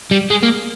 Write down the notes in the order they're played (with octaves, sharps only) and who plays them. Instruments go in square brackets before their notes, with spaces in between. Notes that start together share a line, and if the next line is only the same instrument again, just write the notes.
[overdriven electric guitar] G3
G#3
A#3